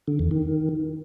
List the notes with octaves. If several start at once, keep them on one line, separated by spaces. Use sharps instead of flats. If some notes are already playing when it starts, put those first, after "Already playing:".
D3
E2
D#3